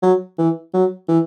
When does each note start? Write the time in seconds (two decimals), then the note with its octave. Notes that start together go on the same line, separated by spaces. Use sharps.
0.03 F#3
0.38 E3
0.74 F#3
1.08 E3